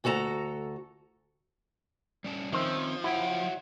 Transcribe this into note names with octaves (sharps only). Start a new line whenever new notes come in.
D2 F#4 A4 A5 A#5
G3 C#4 A5
D#3 F3 C4 C#4 C5 E5
E4 F#4 C#5 F#5 G5